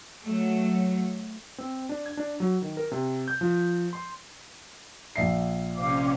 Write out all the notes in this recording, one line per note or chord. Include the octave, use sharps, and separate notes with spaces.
F#3 A3
C4
D4
G#6
D4
F#3
D#3
A#4
C3
G6
F3
C6
A#1 E5 C7
C3 C#4 C5 F5 D6